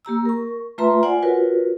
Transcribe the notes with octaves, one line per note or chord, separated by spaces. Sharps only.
A#3 G4 A#5 E6
A#4 C#6
A3 F4 B4 E5 A#5 C6
F4 C5 D5 F#5 G#5
F4 F#4 A#4 B4 C#5